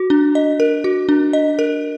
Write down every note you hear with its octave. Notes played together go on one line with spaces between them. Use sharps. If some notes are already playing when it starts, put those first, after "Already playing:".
Already playing: F#4
D4
D#5
A#4
F#4
D4
D#5
A#4